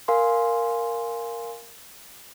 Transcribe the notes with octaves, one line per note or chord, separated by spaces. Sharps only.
A#4 F5 G#5 C6